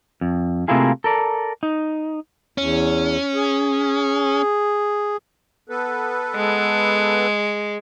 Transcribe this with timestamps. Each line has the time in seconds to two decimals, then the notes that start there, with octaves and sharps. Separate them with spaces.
0.21 F2
0.68 C3 A3 A#3 E4 F4 G#4
1.04 A4 A#4 D5
1.63 D#4
2.58 E2 C#4
3.35 G#4
5.69 B3 A4 B4
6.35 G#3